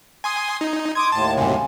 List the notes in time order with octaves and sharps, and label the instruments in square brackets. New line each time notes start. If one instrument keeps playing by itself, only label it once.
[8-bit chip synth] G#5 C6 D#6
D#4
[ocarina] C6 [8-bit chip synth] D6 D#6 G#6
[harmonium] D#2 A2 [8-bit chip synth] A5
[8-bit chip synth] F#2 C3 [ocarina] G#5